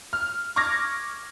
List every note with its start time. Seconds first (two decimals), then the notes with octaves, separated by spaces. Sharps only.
0.13 F6
0.56 C#6 D6 F6 G#6 A#6